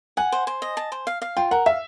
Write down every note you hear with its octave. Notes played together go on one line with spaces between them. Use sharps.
F#5 G#5
C5
C5
D#5
A5
C5
F5
F5
F4 G5
A#4 F#5
E5 F5